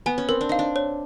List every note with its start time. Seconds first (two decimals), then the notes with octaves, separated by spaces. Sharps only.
0.06 B3 G#5
0.18 C#4
0.29 C4 A#4
0.41 D4
0.49 D#4 F5
0.59 D4
0.76 C#5